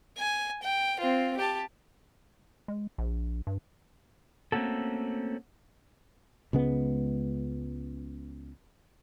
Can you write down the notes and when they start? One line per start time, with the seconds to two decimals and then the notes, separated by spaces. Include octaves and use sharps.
0.18 G#5
0.62 G5
1.00 C4 F4
1.37 G4 A5
2.68 G#3
2.98 A#1
3.47 G2
4.52 A3 A#3 C4 C#4 F#4 A4
6.53 C#2 C#3 G#3 B3